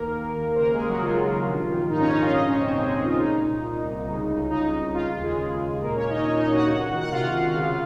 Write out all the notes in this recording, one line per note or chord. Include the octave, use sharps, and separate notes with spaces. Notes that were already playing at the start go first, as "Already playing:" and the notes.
Already playing: D#2 D#3 A#3 A#4
D#3
D#2
C5
C#3 A#3 A#4
G#3 G#4
D#2
F#3 F#4
C#3 F4
D#2
A#1
D#3
G#2 D#4
C#4 C#5
A#1 D#4 D#5
F4 F5
C#3 D#4 D#5
C#4 C#5
D#2
C4 C5
C#3 G#3 G#4
G#3 G#4
D#2
F4
A#2 D#4
C2
A#2
C2
C#3
C#2
C#3 D#4
C#2
C#3 F4
F4
D#2
G#3 G#4
C#3
D#2
A#2 A#3 A#4
C#4 C#5
A#1
D#4 D#5
A#2 C#4 C#5
D#4 D#5
A#1
F#4 F#5
C#2
D#3
F#5
C3 F4 F5
C#2
C#3